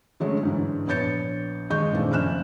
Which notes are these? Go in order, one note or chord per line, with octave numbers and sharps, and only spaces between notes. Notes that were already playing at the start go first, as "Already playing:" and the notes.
D3 F#3 G#3 A3 C#4
G#2 D3 E3
A#1 B3 C#5 G6 A6 C#7
D#2 G#3 D#5 C#6 G6
A#2 D#3 E3 A3 C4 D4
F#1 F2 G#5 F6 F#6 E7